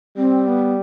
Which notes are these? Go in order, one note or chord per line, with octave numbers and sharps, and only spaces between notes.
G3 C4
B3